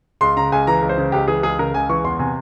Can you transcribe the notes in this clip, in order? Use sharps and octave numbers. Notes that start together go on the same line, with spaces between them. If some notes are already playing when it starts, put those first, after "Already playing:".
C#2 C6
C#3 A#5
C#2 G#5
E3 A#5
C#2
C5
C#3
C#2 G4
E3 G#4
C#2 G#4
C#3 A#4
C#2 G#5
E3 C#6
E2 C6
C3 G#5